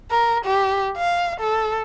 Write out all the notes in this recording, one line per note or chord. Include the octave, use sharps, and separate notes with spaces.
A#4
G4
F5
A4